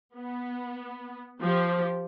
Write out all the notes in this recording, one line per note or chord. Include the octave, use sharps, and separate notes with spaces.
B3
F3 G4